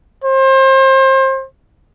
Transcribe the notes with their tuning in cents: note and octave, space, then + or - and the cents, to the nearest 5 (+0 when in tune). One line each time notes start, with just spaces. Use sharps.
C5 +30